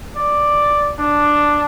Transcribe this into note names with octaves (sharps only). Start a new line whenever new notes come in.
D5
D4